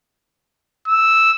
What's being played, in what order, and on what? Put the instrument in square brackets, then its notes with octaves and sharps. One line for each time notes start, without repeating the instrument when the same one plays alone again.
[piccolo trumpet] E6